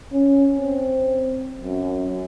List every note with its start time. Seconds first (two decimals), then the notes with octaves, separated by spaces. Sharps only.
0.13 C#4
0.59 C4
1.61 F#2